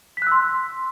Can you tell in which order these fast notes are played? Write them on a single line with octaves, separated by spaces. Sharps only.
B6 F#6 E6 C6